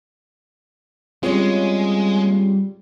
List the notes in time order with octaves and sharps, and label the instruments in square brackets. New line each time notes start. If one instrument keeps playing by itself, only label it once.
[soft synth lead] G3 [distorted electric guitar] G#3 [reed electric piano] C4 F4 G#4 [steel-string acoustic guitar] C#4 C#5 F5